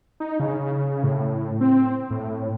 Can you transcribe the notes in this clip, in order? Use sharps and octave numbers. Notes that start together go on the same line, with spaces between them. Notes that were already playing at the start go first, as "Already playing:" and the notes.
D#4
C#3
A2
C4
A2